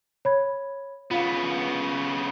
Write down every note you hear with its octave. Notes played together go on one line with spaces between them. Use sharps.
C#5 B5 G#6
C#3 B3 F4 F5